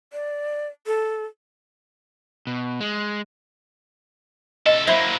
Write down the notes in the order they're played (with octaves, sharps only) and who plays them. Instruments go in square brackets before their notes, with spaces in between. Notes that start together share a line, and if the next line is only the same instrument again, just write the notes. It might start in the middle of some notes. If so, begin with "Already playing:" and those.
[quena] D5
A4
[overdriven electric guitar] B2
G#3
[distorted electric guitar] C2 A4 [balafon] D#5
[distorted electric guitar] F#3 A#3 [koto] E4 C5 E5